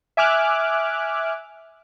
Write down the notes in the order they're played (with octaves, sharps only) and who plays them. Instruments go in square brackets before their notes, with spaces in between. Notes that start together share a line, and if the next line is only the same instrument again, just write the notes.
[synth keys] E5 G#5 D6 F6 F#6